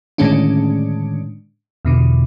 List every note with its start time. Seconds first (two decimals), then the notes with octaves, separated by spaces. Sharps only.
0.18 A2 D3 D#3 G#3 C#4 D4
1.85 E2 B2 D3